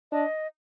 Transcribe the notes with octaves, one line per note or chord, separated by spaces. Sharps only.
D4 D#5